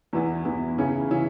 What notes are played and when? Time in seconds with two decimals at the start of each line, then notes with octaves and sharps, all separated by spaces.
0.13 E2 E3 B3 E4
0.45 E2 E3 B3 E4
0.78 C#3 E3 C#4 E4
1.11 C#3 E3 C#4 E4